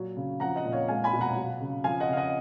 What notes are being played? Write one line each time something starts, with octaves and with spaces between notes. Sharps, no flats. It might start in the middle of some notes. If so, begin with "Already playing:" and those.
Already playing: A#2 F#3
C#3
F3 F#5 A#5
D#5 F#5
A#2
C#5 F5
G#3 F5 G#5
G#5 B5
B2
F#5 A#5
F#3
C#3
F3 F5 G#5
D#5 F#5
C#3 F5
D#5 F#5